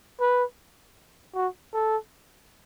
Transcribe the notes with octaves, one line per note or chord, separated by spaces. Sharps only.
B4
F#4
A4